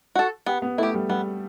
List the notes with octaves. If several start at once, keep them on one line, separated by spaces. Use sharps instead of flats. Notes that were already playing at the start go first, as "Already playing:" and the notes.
F#4 A4
B3 G4
B3
A3 E4 G4
G3
G3 B3